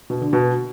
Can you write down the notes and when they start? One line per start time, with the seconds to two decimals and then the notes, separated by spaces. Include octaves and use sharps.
0.10 B2
0.21 D3
0.33 B2